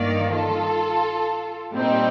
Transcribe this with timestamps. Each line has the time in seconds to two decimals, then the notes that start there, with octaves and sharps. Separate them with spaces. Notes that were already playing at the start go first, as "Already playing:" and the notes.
Already playing: G2 D#3 A#3 D5 F5
0.33 F4 A4
1.73 A#2 G3 C4 D#4 G4